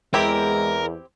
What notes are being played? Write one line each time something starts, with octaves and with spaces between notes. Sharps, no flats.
E2 G#3 C4 E4 G4 A#4